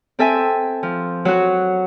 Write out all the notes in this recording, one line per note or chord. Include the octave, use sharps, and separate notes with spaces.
C4 A4 E5 G#5
F3
F#3 F#4